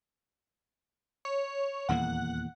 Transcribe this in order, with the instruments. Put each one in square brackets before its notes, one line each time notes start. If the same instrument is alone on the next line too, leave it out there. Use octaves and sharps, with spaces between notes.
[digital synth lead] C#5
[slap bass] D#1 E2 A#3 [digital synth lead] F#5